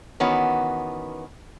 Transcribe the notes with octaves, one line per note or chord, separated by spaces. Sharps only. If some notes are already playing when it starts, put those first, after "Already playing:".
D#3 E3 B3 C#4 F#4